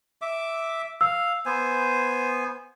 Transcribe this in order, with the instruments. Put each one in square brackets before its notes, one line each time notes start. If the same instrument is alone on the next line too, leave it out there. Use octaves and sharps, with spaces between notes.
[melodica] E5 D6
[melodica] F5 [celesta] E6
[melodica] B3 C5 G#5